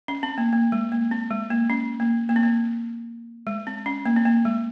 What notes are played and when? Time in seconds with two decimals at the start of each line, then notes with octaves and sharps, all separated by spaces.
0.08 C#4
0.23 C4
0.38 A#3
0.53 A#3
0.72 G#3
0.92 A#3
1.11 C4
1.31 G#3
1.50 A#3
1.70 C#4
2.00 A#3
2.29 A#3
2.36 C4
2.43 A#3
3.47 G#3
3.67 C4
3.86 C#4
4.06 A#3
4.16 C4
4.25 A#3
4.45 G#3